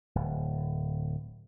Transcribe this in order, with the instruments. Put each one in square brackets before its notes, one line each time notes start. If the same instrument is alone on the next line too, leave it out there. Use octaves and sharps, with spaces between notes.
[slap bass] D1